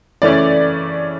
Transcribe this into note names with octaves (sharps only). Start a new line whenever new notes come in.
C#3 E3 A3 C#4 D5